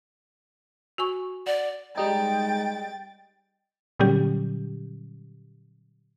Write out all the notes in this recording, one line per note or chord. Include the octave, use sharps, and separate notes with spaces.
F#4 G#5 C#6
D5 F#5
G3 G#3 D#4 G5 A6
A#2 D3 F#3 G3 C#4 G4